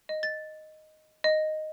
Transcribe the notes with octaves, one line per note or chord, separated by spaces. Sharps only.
D#5
A6
D#5